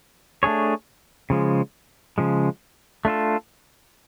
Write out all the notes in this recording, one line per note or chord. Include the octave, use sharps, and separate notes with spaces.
A3 D4 G#4 C#5
C#3 F3 G#3
C#3 F3 G#3
A3 D4 F4 A4